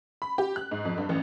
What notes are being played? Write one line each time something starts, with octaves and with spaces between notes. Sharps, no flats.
B5
G4
F#6
G#2
F2
G2
A1